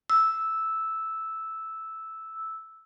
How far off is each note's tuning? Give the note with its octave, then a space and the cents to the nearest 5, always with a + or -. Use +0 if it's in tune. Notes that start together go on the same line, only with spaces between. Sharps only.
E6 -5